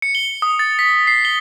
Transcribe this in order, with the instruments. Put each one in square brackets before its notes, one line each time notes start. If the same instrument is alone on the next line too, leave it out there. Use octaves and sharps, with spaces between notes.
[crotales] C#7
G7
D#6
A6
B6
C7
G7